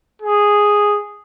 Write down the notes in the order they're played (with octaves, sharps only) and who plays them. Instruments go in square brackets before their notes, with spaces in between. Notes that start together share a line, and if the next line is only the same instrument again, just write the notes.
[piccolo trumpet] G#4